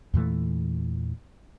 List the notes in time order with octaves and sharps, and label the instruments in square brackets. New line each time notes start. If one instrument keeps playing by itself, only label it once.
[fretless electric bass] E2 A#2 E3 A3